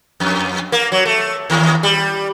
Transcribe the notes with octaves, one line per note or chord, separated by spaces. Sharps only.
F2
A#3
F#3
A3
D#2
G3